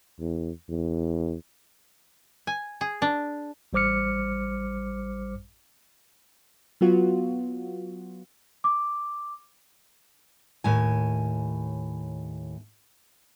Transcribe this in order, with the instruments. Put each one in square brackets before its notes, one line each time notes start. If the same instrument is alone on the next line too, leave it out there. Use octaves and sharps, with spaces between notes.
[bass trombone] E2
E2
[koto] G#5
G#4
D4
[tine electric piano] A1 G3 C5 D6 F6 C#7
[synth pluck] F#3 B3 F4 F#4
[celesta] D6
[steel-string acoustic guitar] D#2 A2 G#5